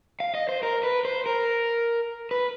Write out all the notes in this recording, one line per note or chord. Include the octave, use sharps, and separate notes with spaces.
F5
D#5
C5
A#4
B4
C5
A#4
B4